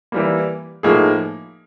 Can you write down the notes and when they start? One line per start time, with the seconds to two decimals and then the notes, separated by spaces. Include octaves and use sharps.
0.12 E3 G3 A#3
0.83 A2 F3 A#3 D#4 G#4